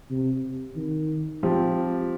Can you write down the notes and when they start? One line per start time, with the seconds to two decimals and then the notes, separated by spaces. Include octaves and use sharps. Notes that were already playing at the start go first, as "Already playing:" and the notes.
0.10 C3
0.76 D#3
1.43 F3 C4 G4